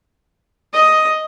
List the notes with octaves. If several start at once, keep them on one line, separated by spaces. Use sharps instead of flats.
D#5